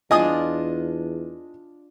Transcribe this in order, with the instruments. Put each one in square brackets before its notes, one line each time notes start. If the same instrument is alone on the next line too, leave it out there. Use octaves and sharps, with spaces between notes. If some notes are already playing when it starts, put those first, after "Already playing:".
[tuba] E2 [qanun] D4 F4 [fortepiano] D#5 G#5 D#6